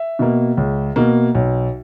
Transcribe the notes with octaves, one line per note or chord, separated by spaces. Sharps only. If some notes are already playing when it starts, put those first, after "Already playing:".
Already playing: E5
B2 A#3
C#2
B2 A#3
B1